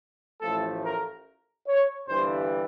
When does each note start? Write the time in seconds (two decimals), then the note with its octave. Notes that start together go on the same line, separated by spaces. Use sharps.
0.41 A1 A2 F3 A3 A4
0.83 A#4
1.67 C#5
2.08 G1 G2 E3 G3 C5